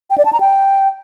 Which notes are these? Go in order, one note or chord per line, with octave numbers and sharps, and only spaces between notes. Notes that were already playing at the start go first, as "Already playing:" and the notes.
G5
D5
A5
A#5
G5